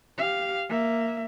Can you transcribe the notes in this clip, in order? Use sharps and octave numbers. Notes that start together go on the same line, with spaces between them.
G4 F5
A#3 E5